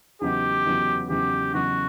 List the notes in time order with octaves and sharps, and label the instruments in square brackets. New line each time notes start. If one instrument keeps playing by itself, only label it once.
[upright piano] E2 C#3 F#3 B3 D#4 [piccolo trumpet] G4
[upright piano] E2 C#3 F#3 B3 D#4
[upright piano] E2 C#3 F#3 B3 D#4 [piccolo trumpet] G4
[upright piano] E2 C#3 F#3 B3 D#4 [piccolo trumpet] F#4